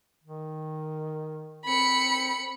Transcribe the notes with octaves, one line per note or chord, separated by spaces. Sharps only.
D#3
C4 B5 C#7